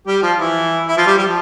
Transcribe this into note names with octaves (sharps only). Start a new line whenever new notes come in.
G3 G4
F3 F4
E3 E4
E4
F3 F4
G3 G4
G3 G4
F3